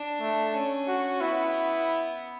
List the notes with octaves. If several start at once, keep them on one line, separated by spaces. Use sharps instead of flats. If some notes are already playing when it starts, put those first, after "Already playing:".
Already playing: D4
A3
C#4
F#4
B3 E4